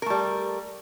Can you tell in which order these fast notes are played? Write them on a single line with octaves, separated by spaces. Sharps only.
A#4 A3 G3